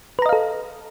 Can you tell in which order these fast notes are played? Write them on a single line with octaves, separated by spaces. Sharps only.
B4 A#5 D#5 F5 A4